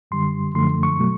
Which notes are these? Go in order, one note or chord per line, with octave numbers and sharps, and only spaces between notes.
F#2 D3 G3 C6
F#2 D3 F3 A3 C6
C#6
B2 F#3 A3